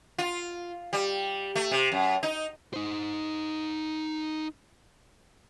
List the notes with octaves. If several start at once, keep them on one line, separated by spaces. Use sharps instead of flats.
F4
G3
A3
C3
F#2
D#4
D#4 C5